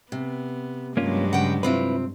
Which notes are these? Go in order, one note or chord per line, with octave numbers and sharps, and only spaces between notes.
C3 B3
G2 F#3 G#3 A#3 C#4 F4
C#3 F#5 G5
C3 C4 E4 F4 B4